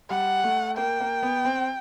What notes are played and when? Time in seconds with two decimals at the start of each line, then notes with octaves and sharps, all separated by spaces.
0.10 G3 F#5
0.44 A3
0.77 A#3 G5
1.01 A#3
1.23 B3
1.45 C4